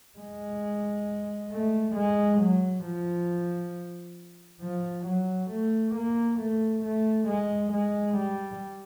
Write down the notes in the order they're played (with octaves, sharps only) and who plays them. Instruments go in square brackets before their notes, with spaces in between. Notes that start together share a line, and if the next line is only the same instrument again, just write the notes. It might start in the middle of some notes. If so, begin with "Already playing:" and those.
[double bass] G#3
A3
G#3
F#3
F3
F3
F#3
A3
A#3
A3
A3
G#3
G#3
G3